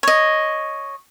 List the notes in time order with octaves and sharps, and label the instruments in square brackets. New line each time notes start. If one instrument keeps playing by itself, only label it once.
[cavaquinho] C#5 D#5